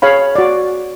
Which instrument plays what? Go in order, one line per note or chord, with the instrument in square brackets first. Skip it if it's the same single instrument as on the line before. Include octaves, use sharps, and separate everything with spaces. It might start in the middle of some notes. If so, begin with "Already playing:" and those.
[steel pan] G#4 C#5 F5 B5
F#4 D5